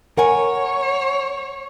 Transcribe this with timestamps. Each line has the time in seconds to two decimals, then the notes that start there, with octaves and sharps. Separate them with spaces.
0.17 A#4 C#5 F#5 G#5